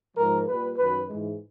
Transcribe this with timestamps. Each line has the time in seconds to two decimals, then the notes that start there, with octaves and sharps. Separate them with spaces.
0.17 G#2 F3 G#3 A#4
0.48 A#2 G3 B4
0.77 F#2 D#3 F#3 B4
1.08 G#2 E3 G#3